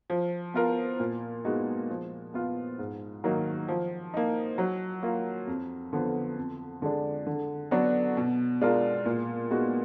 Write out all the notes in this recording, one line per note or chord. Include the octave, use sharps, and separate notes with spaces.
F3
B3 F4 A#4
A#2
G#3 B3 D#4 F#4
F3
B3 F4
G#2
D#3 F#3 A#3 D#4
F3
A#3 D#4
F#3
A#3 F4
F2
D3 F3 B3
F2
D3 G#3 D4
D3
F#3 B3 D4 F#4
B2
G#3 D4 F4 A#4
A#2
G#3 B3 D#4 F#4